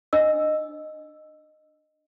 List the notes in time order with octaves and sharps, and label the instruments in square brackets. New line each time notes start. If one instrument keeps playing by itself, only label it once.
[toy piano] D4 D#5 E6